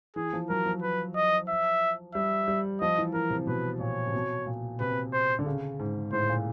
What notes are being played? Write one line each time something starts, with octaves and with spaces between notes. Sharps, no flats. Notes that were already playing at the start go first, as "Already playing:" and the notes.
E3 G#4
F3
F#3 A#4
F3
B4
D#5
E5
G3 E5
G3
F3 D#5
E3
E3 A#4
C3
B2 B4
A#2 C#5
C3
B2
A#2
C3 B4
C5
D3
C#3
G#2
A2 C5
A#2